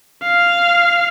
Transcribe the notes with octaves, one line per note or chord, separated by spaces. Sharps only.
F5